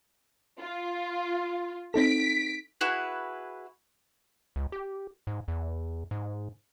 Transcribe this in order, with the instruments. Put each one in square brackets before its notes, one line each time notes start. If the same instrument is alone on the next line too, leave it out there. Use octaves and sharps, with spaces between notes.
[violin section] F4
[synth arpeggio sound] C4 D#4 A4 [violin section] B6 D7
[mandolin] E4 F#4 G#4 B4
[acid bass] C#2
G4
G#2
E2
G#2